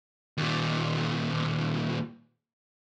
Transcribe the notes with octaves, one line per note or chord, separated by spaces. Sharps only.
D#2 A#2